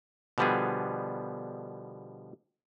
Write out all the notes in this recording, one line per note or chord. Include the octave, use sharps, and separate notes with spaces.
B2 D3 F3 G3 B3 G#4